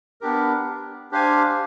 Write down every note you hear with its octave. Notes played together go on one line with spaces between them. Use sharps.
B3 D4 G4 A#4
D4 G4 C5 F5 G#5